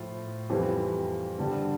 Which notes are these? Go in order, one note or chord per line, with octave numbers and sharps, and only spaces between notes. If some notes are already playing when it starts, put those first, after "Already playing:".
Already playing: A2 F3 F4
F2 E3 G3 G4
G2 D3 G3